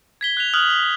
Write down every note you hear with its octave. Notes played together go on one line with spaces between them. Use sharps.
G#6 B6 G7
F#6 B6 F7
D#6 F6 F#6 F#7
G7